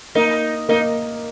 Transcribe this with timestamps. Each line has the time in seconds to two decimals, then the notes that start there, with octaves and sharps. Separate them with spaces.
0.15 A#3 D#4
0.69 A#3 D#4